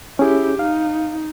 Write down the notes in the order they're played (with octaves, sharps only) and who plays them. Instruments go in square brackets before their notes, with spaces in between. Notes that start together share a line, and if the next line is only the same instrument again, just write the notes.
[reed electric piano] C#4 G#4 [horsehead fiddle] E4 G4
[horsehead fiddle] D#4 [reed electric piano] F5